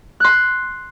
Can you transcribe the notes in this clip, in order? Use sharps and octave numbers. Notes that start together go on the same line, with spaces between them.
C6 F#6